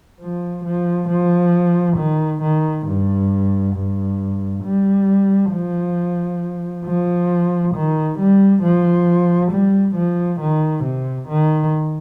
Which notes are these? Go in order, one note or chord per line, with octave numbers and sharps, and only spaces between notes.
F3
F3
F3
D#3
D#3
G2
G2
G3
F3
F3
D#3
G3
F3
G3
F3
D#3
C3
D#3